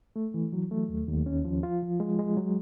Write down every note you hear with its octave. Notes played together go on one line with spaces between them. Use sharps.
A3
E3
F#3
A3
D#2
D#2
C#4
F3
F4
F3
G#3
G#3
F#3